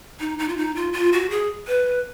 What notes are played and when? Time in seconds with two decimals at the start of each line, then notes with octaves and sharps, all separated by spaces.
0.20 D#4
0.39 D#4
0.49 F4
0.57 D#4
0.76 F4
0.93 F4
1.13 F#4
1.30 G#4
1.68 B4